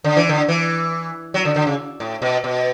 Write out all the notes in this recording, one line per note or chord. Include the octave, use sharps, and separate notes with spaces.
D3
E3
D3
E3
F#3
D3
D3
C#3
A2
B2
B2